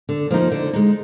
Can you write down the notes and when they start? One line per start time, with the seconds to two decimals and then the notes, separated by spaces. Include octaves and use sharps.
0.09 D3
0.30 F3 A#3 D#4
0.52 D3
0.73 G#3 D#4